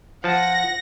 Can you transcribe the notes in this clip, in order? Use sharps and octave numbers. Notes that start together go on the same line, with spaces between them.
F3 F#5 A5 A#6